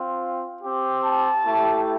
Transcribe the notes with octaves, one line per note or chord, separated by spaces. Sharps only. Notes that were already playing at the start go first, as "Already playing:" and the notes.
Already playing: C4 F4
C4 G4
A5
A3 E4 G4